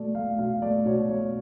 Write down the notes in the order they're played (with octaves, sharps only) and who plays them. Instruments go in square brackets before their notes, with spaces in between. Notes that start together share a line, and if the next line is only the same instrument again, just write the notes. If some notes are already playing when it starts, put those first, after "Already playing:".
Already playing: [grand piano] B2 A3 D5
A3 F5
B2 F5
A3 D5
B2 C#5
A3 C#5